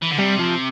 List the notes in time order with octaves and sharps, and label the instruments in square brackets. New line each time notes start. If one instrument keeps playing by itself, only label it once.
[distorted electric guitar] E3
D3
[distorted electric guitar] C3 [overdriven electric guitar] G3
[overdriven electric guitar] F3